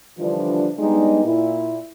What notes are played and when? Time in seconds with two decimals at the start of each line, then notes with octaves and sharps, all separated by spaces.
0.18 D3 E3 F3 G3 D4 F4
0.78 G3 G#3 B3 D4 D#4
1.25 A#2 E4